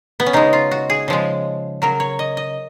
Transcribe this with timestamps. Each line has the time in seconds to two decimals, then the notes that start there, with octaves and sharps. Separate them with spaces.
0.20 B3
0.26 C#4
0.33 C#3 G#3 D#4
0.53 F4
0.71 F#4
0.90 G#4
1.08 C#3 F3 G#3
1.82 C#3 F#3 A#4
2.00 C#5
2.19 D#5
2.37 D#5